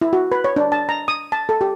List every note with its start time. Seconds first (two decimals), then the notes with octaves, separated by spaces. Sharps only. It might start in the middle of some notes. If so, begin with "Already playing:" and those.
0.01 E4
0.13 F#4
0.32 B4
0.44 C#5
0.56 D4
0.72 A5
0.89 A#5
1.08 D#6
1.32 A5
1.49 A4
1.61 G4